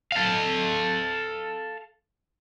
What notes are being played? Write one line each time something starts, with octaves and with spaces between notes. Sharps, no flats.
A4 F5